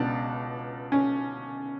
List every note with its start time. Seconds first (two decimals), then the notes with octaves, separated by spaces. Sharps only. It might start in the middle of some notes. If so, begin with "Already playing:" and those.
Already playing: C#2 B2 D4
0.92 C#4